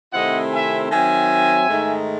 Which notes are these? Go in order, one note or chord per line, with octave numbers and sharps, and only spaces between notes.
C3 D#3 A3 C4 E4 D#5 F#5
E5 G#5
D#3 F#3 C4 E5 G#5
G#2 D#3 A3 D#4